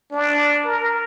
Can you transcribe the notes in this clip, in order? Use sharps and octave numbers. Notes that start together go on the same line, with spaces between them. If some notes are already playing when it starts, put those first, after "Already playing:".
D4
A#4